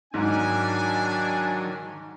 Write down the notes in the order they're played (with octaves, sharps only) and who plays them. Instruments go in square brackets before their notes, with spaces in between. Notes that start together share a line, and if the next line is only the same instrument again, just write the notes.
[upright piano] G#2 [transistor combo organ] D#3 F#3 [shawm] D4 [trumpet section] G#5